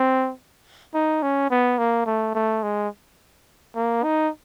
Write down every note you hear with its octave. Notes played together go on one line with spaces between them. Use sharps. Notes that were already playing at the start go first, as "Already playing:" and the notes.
Already playing: C4
D#4
C#4
B3
A#3
A3
A3
G#3
A#3
D#4